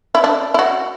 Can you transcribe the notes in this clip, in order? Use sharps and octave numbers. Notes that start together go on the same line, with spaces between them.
E4
D4
E4
F#4